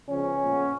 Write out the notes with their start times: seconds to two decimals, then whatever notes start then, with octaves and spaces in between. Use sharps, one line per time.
0.08 C#3 F3 G#3 B3 C#4
0.38 A#2 F3 G#3 B3